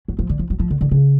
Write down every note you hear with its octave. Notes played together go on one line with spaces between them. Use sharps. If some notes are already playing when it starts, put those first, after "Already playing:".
F#3
F3
D3
F3
F#3
F3
D3
D3
C#3